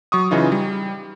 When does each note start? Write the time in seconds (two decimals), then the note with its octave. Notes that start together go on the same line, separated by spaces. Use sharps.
0.12 F#3 C#6 D#6
0.31 C#3 E3 D#4 F4
0.52 G3